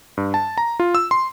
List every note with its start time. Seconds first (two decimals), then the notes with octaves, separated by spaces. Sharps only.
0.17 G2
0.34 A5
0.58 A#5
0.80 F4
0.95 E6
1.11 C6